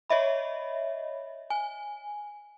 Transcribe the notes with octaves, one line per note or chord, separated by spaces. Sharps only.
C#5 D#5 E5 B5
G#5